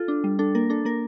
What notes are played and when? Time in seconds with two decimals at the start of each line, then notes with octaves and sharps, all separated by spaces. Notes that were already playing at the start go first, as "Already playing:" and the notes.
Already playing: F4 A4
0.08 D4
0.24 G3
0.39 D4 A4
0.55 A#3 A#4
0.70 D4 A4
0.85 A#3 A#4